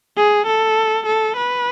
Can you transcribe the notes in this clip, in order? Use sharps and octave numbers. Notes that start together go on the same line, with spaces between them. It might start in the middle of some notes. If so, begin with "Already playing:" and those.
G#4
A4
A4
B4